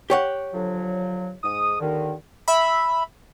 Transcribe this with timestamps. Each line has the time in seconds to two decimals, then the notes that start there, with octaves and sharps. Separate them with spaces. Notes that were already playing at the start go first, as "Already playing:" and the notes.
0.10 G4 C#5 F#5
0.54 D3 F3 F#3
1.43 G#2 D#6
1.80 D#2 D3 D#3
2.48 E5 B5